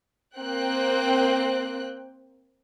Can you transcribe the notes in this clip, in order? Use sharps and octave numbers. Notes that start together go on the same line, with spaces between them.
A#3 C4 G5 F#6